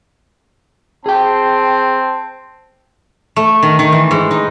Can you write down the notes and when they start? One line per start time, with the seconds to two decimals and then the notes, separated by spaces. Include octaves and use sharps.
1.06 C4 G#4 G5 A5
3.36 A3
3.63 D#3
3.79 D#3
3.92 E3
4.11 G#2
4.31 D#4